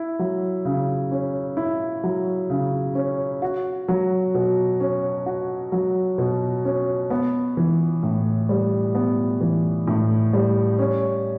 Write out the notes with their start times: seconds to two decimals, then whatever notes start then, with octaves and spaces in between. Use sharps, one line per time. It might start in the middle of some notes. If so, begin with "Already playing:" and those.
Already playing: E4
0.19 F#3
0.65 C#3
1.11 C#4
1.57 E4
2.04 F#3
2.50 C#3
2.95 C#4
3.42 F#4
3.88 F#3
4.34 B2
4.80 C#4
5.26 F#4
5.72 F#3
6.18 B2
6.65 C#4
7.10 B3
7.57 E3
8.03 A2
8.49 G3
8.95 B3
9.41 E3
9.87 A2
10.33 G3
10.79 C#4